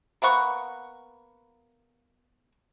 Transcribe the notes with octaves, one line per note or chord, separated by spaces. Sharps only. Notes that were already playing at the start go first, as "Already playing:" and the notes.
A#3 B3 F#5 C#6